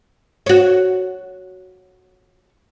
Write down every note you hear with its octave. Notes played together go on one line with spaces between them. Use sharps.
F#4 C#5